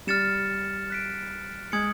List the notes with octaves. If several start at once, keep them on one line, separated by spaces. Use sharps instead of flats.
G3 F6 A6 C#7 E7
F#6 B6 D7
G#3 D#6 G#6 C#7 F#7